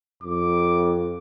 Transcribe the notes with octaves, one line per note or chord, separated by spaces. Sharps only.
F2 D6